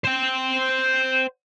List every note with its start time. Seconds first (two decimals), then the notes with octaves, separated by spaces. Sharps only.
0.05 C5 G5